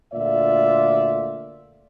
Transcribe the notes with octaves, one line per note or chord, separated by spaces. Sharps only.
D2 A#2 D3 F4 D5 E5